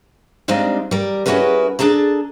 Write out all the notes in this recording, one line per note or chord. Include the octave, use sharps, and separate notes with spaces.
G3 G#3 C4 D4 D#4 F5
G3 A#4
C#4 E4 F#4 G#4 A#4 B4
D4 G#4 A4 A5 A#5